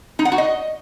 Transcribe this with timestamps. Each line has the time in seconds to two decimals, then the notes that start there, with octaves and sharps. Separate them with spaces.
0.19 D#4
0.25 F#5
0.32 F#4
0.38 D#5